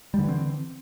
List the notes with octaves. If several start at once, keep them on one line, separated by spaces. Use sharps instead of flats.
D3 E3 G3 C4